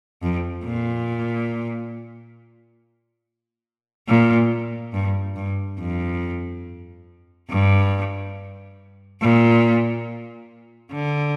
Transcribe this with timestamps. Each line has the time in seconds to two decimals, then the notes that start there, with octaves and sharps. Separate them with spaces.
0.23 F2
0.65 A#2
4.08 A#2
4.93 G2
5.36 G2
5.79 F2
7.50 G2
9.21 A#2
10.93 D3